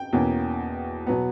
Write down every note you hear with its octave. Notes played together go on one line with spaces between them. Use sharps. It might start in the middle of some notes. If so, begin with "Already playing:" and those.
Already playing: G5
E2 B2 A#3 C#4
B2 F#3 B3